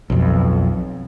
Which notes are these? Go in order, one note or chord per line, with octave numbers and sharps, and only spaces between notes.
B1 F2